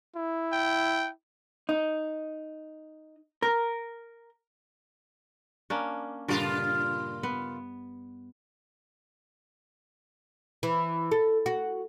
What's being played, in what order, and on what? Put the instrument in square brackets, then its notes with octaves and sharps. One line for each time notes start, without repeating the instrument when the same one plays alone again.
[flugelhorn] E4
[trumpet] G5
[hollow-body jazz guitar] D#4
A#4
[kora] A#3 C#4 D4
[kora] G2 A#2 D5 [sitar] C#3 F4 A#4
[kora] B3
[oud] E3
A4
F#4